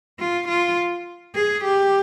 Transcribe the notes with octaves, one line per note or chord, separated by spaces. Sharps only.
F4
F4
G#4
G4